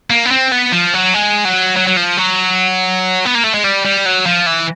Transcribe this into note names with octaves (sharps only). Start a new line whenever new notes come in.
A#3
B3
C4
B3
F3
F#3
G#3
F#3
F#3
F#3
F3
F#3
B3
A#3
A3
G#3
G3
G3
F#3
F3
E3